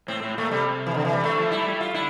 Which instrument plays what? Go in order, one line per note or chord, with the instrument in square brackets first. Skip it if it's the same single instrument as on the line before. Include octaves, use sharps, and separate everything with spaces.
[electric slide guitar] A2 [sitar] C4
[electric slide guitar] A2
[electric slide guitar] A#2 [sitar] A3
[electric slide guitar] C3 [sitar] G3
[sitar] E3
D3
E3
G3
[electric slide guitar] D3 [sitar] A3
[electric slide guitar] F3
[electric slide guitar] G3 [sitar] E4
[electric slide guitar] A3
G3
[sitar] F4
[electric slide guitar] D3 [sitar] E4